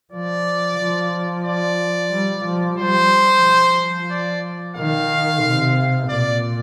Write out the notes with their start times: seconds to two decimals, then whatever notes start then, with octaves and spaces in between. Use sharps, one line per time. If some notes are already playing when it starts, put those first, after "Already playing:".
0.12 F3 D5
0.79 F3
1.45 D5
2.11 G3
2.45 F3
2.77 G3 C5
3.44 F3
4.10 D5
4.76 D#3 F5
5.42 C3
6.09 A#2 D5